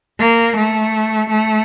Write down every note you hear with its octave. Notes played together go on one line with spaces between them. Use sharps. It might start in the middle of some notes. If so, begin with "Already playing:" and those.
A#3
A3
A3